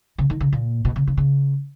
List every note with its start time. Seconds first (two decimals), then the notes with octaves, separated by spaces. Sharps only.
0.18 C#3
0.30 D#3
0.40 C#3
0.52 A#2
0.85 B2
0.96 C#3
1.07 C#3
1.17 C#3